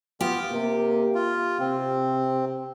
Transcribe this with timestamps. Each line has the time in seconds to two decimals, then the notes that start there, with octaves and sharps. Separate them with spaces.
0.21 B3 F4 G4
0.52 C3 A#3
1.15 F4
1.60 C3 C4